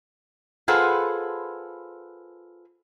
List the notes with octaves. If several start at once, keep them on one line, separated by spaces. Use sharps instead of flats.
F4 G#4 A4 B4 C5 F#5